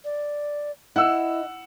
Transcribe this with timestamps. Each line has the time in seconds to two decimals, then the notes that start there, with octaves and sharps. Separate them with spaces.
0.05 D5
0.96 E4 D#5 F#5 E6